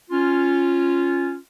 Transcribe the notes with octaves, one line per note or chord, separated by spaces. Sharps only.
C#4 F4